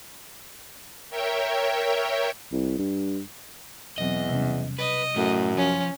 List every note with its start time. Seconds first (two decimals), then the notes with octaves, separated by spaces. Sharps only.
1.10 A#4 C#5 E5 G5
2.52 C2
2.78 G2
3.98 E2 B2 F#3 C4 D#5
4.29 C3 G3 C#4
4.79 B4 D#5
5.16 F#2 A2 A3 A4
5.57 F3 C#4